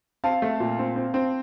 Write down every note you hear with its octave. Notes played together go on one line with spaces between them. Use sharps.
C4 F5 A5
A3
A#2
C4
C4
C4